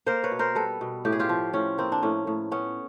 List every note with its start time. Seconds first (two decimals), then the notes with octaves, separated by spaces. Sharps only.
0.06 A#3 A#4 C5
0.24 B4 C#5
0.31 B2
0.39 A#4 C5
0.55 G3 A4 B4
0.81 B2
1.05 A2 G4
1.12 G#4
1.19 F4 G4
1.29 F3
1.54 A2 C#4
1.78 A#3 C4
1.92 D4
2.03 A2 C#4
2.27 A2
2.51 B3 C#4